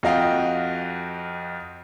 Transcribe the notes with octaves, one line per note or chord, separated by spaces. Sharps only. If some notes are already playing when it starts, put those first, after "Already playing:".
F2 F#4 D#5 F5 G5